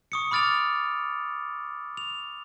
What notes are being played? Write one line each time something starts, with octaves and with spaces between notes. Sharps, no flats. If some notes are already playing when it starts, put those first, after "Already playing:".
C#6 D#6 C#7
B5 D6 F6 A6 D7 F7
F7